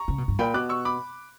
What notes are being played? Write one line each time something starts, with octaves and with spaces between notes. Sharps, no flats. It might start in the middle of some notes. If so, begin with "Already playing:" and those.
Already playing: A#5 C#6
C#3
B2
G2
A#2 G5 B5
B2 D6 F#6
C#6 E6
B5 D6